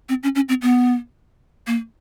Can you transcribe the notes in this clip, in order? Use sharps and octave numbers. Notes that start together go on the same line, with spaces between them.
C4
C#4
C#4
C4
B3
A#3